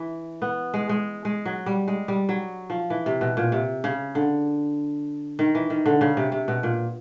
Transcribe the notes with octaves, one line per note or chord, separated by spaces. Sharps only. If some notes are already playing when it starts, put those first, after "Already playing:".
Already playing: E3
B3
G#3
G#3
G#3
F#3
G3
G#3
G3
F#3
F3
E3
C3
B2
A#2
C3
C#3
D3
D#3
E3
D#3
D3
C#3
C3
C3
B2
A#2